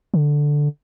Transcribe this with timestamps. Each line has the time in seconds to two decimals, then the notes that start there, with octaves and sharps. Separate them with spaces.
0.14 D3